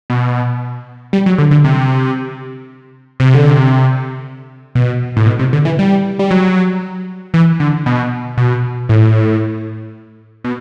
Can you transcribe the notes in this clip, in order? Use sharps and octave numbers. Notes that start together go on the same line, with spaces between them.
B2
G3
F#3
D3
D3
C3
C3
D3
C3
B2
A2
B2
C3
D3
E3
G3
G3
F#3
E3
D3
B2
B2
A2
B2